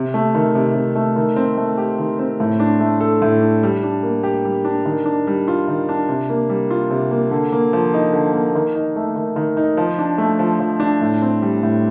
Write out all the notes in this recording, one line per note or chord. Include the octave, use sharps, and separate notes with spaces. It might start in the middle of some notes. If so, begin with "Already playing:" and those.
Already playing: C3
A3
D#3
C3
C3
A3
D#3
C4
A3
G4
D#3
C4
A2
D4
A3
A4
A2
D4
G3
D4
A#3
G4
G3
D4
D#3
D4
G3
F4
D#3
D4
C3
A#3
G3
F4
C3
A#3
D3
A#3
F3
D#4
D3
A#3
D#3
D#4
A3
D#3
D#3
D#4
F3
D4
A3
F3
F3
D4
A2
C4
G3
A2